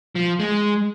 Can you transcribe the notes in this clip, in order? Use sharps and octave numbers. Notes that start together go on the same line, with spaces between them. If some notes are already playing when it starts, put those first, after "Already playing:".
F3
G#3